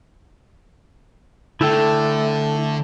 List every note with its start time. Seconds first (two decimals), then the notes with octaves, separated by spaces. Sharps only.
1.61 D3 A3 E4 A4 G5